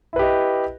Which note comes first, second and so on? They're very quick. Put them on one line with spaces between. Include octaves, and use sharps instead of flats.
E4 B4 G4 D#5